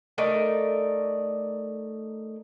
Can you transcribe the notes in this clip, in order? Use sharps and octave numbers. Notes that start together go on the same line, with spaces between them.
A3 D#4 A#4 D5